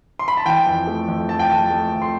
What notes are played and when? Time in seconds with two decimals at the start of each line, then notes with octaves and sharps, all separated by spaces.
0.19 C6
0.28 B5
0.37 A5
0.45 E3 G5
0.66 F2
0.87 A3
1.08 F2
1.29 F2 A5
1.39 G5
1.50 F2 A5
1.70 A3
1.92 F2
2.02 C6